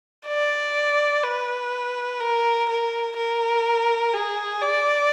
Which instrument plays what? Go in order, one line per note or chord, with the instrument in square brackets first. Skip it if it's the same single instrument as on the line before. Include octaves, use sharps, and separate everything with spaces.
[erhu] D5
B4
A#4
A#4
A#4
G#4
D5